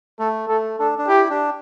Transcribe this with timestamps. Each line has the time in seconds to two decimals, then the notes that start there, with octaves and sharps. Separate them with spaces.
0.19 A3 A4
0.49 A3 A4
0.79 D4 A4
0.98 D4
1.08 E4 G4
1.30 D4